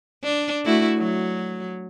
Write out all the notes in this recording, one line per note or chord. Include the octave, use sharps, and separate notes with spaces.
D4
A3 E4 F#4
F#3